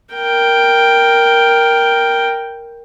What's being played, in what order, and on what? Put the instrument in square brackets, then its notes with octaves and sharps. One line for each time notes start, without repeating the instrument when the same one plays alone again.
[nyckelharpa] A#4 G5